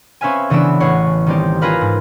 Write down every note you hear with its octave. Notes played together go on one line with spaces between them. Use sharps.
C4 C#4 B4 E5 F5 G#5
C#3 E3 B3 D4 E6 D7
A1 C#5 F#5 C7
D#3 G3 C4 D#4 G4
F4 G#4 A#4 B4 F5
G#2